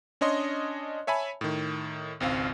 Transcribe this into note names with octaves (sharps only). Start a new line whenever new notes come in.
C#4 D4 C#5 D#5 C6
C#5 E5 G#5 A5 B5
A2 D#3
G#1 C#2 C4 F5